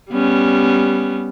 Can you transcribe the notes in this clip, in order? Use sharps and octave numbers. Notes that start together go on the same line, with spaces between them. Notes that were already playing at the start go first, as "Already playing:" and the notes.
G3 B3 C#4